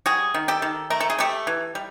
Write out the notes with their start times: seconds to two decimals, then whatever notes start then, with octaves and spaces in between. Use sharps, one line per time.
0.06 G3 F#4 G#4
0.34 D#3
0.48 G4 A4
0.62 D#3
0.90 A3 A#4
1.00 A4
1.10 G#4
1.19 A3 G4 A4
1.47 E3
1.75 G3